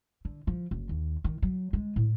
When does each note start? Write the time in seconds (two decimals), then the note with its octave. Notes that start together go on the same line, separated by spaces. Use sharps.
0.25 D3
0.47 F3
0.71 F#1
0.89 D#2
1.24 D#3
1.42 F#3
1.73 G#3
1.96 A2